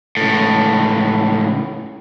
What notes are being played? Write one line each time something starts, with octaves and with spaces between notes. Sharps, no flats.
C#2 A2